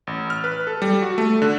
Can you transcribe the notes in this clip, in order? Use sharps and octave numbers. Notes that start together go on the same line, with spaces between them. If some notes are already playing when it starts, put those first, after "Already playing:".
A1
F6
B4
A4
G3
F#4
A3
D3